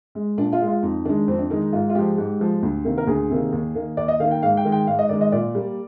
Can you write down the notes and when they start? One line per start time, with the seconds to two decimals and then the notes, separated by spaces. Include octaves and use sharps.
0.15 G#3
0.38 A#2 D4
0.53 F4
0.61 G#3
0.67 F4
0.83 F2 D#4
1.05 D#3 G#3 D4
1.28 F2 C4
1.39 D4
1.50 D#3 G#3 D#4
1.61 D#4
1.73 G#2 F4
1.89 F4
1.95 F3 G#3 G4
2.18 G#2 G4
2.40 F3 G#3
2.63 D2
2.84 C3 D#3 A#3
2.98 A#4
3.07 D2 G#4
3.30 C3 D#3 A#3
3.52 D#2
3.75 D#3 A#3
3.97 D#2 D5
4.08 D#5
4.20 D#3 A#3 F5
4.31 G5
4.43 G#2 F5
4.57 G5
4.65 D#3 G#3
4.72 G5
4.87 G#2 F5
4.99 D#5
5.09 D#3 G#3 D5
5.21 D#5
5.32 A#2 D5
5.55 G3 A#3